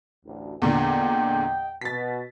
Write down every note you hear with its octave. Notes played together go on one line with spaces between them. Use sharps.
A1 D2
E2 A#2 D3 D#5 F#5 G5
B2 A6 B6